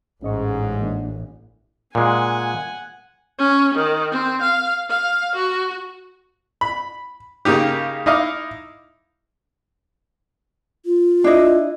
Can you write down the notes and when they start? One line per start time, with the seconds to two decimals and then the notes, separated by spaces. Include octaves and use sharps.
0.23 A1 G#2 C#4 D#5 C#6
0.79 E3 A#3 D4
1.95 A#2 G#3 F#5 G#5
3.39 C#4
3.75 D#3
4.12 C4
4.42 F5
4.90 F5
5.36 F#4
6.61 B5
7.45 C#3 A#3 D#4 G4
8.06 D#4 E4 D#5 F5 D6
10.85 F4
11.24 D4 E4 D#5